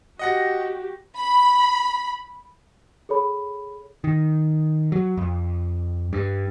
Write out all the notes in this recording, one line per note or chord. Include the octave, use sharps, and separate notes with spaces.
F#4 G4 D#5 F#5 A#6
B5
G#4 A4 C#5 B5
D#3
F#3
F2
G2